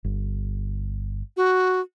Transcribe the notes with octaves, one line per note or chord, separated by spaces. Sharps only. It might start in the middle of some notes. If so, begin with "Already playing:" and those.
G1
F#4